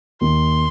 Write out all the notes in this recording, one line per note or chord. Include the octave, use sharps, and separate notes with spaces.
D#2 C6